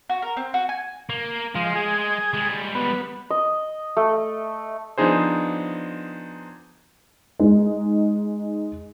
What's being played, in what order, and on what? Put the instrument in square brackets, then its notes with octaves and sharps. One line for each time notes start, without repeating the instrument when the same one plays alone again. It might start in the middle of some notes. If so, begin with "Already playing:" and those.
[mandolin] F#4
A#4
C4
F#4
G#5
[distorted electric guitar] A#3
[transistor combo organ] F3 [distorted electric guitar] G#3
[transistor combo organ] G#4
[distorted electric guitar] G3 G#3
[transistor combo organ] B3
[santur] D#5
A3
[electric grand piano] F3 B3 D4 D#4 G#4 C5
[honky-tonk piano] G#3 D#4